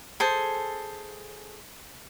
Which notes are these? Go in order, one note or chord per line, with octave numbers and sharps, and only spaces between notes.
G#4 A4 C5 A5